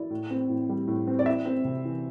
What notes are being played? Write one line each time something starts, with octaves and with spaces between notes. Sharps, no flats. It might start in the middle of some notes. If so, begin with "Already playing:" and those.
Already playing: E4 D5
A2
C4
A2
G3
A2
C4
D5
E4 E5
C4
C3
E3